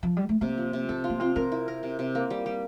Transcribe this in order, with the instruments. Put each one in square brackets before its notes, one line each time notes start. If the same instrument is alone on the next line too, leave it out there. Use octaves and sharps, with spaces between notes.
[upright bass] F3
G3
A3
[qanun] C3 [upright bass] A#3
[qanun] F3
C3
[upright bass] C4 [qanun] A4
[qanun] F4
[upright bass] A#3
[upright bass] C4 [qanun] F4
[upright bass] C4 [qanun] A#4
[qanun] E4
A#4
C3
C3
A#3
G3
G3